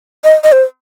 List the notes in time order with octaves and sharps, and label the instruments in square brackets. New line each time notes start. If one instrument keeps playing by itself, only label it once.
[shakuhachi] D#5
D#5
C5